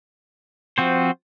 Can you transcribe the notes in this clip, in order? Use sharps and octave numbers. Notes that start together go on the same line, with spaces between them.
F3 C4 F#4 C5